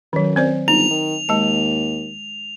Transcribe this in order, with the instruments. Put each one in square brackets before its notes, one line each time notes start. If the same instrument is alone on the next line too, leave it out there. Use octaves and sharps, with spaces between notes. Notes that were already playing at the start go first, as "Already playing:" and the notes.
[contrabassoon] F#2 [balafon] D#3 F#3
[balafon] C4 C5 D5
[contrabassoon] G1 [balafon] D#4 [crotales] F7
[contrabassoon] D#3
[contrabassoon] D#2 [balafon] G#3 A5